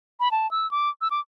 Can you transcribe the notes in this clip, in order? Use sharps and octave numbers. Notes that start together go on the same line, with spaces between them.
B5
A5
E6
D6
E6
D6